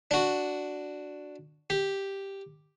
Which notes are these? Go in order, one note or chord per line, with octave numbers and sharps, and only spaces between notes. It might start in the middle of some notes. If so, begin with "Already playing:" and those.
D4 F#4
G4